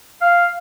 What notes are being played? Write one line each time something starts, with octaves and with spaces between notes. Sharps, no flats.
F5